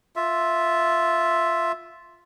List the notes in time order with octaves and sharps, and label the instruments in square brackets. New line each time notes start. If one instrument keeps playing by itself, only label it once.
[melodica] F4 E5